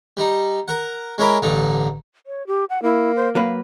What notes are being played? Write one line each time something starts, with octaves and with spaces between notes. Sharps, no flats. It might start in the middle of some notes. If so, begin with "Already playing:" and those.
G3 D#4
A#4 F#5
G#3 C#4 E4 A#4 B5 D6
A1 G2 D3 D#4
C#5
G4
F#5
A#3 E4
C5
F#3 A#3 B4 F5